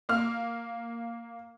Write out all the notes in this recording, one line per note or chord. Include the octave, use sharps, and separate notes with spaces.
A#3 F6